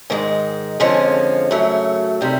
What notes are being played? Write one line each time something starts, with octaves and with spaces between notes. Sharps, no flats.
G#2 D#3 G#3
F2 D3 F3 G#3 C#4
F#2 C#3 F#3 A3
C3 D#3 G3